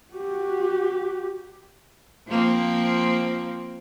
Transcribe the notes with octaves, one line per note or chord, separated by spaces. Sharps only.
F#4 G4
F3 A#3 C4